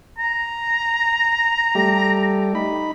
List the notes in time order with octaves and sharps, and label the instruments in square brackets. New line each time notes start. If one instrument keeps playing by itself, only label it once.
[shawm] A#5
[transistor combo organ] G3 A3 G4
D#4 B5